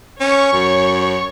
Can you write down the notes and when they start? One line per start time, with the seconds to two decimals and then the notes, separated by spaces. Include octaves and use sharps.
0.20 C#4 C#5 C#6
0.53 F#2